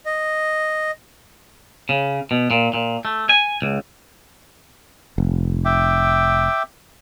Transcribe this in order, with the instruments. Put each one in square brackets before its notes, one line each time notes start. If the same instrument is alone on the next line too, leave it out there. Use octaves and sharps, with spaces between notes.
[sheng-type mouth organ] D#5
[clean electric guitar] C#3
B2
A#2
A#2
A3
G#5
C#2
[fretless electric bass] F1
[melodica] E5 G5 D6